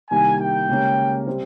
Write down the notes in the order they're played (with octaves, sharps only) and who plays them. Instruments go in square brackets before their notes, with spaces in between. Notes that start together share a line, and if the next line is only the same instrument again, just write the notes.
[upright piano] C2 C3 D#3 A#3 [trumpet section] G#5
[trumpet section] G5
[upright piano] C#2 C#3 G3 A#3 C#4
C3 G3 C4